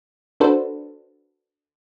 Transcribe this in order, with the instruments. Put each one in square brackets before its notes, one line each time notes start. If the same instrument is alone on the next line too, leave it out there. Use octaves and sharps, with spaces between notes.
[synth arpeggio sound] D4 F#4 A4 B4 C5